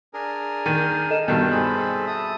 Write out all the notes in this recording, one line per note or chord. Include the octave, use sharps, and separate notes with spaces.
D4 G#4 A#4
D#3 G6 D#7
A4 D#5 E7
G2 B2 D#3 A4 G6
C4 G#4 B5
E5 A5 D#6